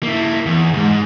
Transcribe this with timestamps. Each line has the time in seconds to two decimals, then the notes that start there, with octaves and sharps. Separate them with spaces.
0.03 A#3 E4
0.46 E2
0.73 C#2 G#2